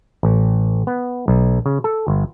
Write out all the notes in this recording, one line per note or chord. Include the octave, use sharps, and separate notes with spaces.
A1
B3
B1
C#3
A4
G1